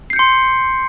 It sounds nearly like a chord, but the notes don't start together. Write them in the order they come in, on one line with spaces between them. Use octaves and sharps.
C7 G6 C#7 C6